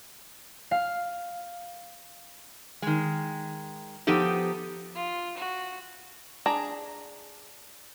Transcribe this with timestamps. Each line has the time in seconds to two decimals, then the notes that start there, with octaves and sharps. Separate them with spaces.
0.71 F5
2.82 D#3 G#3
4.07 F3 B3 D#4 G4 A4
4.96 F4
5.38 F#4
6.46 D4 G#4 A#5